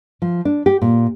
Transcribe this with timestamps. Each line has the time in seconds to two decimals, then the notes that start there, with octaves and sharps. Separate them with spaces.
0.22 F3
0.45 D4
0.66 G4
0.82 A#2